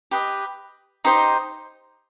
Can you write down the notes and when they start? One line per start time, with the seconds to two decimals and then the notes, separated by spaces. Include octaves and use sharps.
0.11 G4 B4 D#5
1.05 D#4 G4 C5 D#5